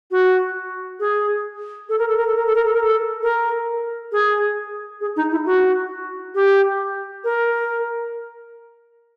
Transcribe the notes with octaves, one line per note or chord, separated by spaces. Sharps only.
F#4
G#4
A4
A#4
A4
A#4
A4
A#4
A4
A#4
A4
A#4
A4
A#4
G#4
G#4
D#4
E4
F#4
G4
A#4